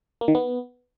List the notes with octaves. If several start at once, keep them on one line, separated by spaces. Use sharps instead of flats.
A#3
D#3
B3